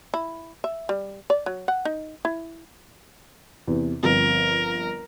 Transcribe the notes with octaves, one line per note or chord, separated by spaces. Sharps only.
E4
E5
G3
D5
F#3
F#5
D#4
E4
E2 C3
G1 F3 C4 A#4